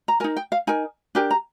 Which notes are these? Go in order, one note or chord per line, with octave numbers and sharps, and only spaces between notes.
A#5
D#4 A#4 G#5
G5
F5
D#4 A#4 G#5
D4 G4 A#4 G#5
A#5